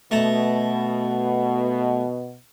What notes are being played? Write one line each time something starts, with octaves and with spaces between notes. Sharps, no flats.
B2 A3 A5 A#5